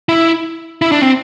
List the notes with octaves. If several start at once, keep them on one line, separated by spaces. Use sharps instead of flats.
E4
E4
D4
C4